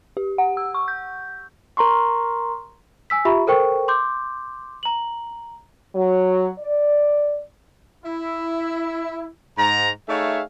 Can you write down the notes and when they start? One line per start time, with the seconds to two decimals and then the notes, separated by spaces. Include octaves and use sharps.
0.17 G4
0.38 F#5
0.57 E6
0.74 C#6
0.88 G6
1.77 A#4 A#5 C6 C#6
3.10 G#5 E6 B6
3.25 F4 G4 E5 A#5 B5 C#6
3.47 A4 A#4 C5 G5 C#6
3.88 C6 D6 G6
4.83 A#5 F#7
5.95 F#3
6.59 D5
8.05 E4
9.58 G#2 A#5
10.09 A3 D#4 G#4 C#5 E5 F5